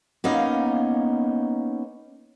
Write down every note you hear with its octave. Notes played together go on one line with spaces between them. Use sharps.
A#3 B3 C#4 D#4 D#5 F5